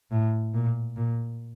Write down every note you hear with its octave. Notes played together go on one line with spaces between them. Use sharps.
A2
A#2
A#2